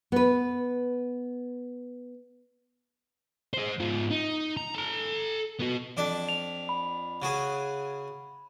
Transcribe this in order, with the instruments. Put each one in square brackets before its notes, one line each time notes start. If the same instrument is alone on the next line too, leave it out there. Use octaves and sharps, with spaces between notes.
[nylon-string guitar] B3 B4
[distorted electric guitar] G#4 C5
G#2 F4
D#4
A#5
A4 A#5
B3 F#4
[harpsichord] F2 D4 A5
[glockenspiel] F7
B5
[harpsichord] C#3 F#4 G#4